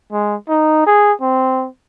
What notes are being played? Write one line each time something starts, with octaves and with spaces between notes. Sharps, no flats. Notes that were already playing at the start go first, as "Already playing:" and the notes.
G#3
D#4
G#4
C4